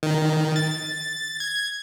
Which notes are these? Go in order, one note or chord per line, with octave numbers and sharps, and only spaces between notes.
D#3
A6
G#6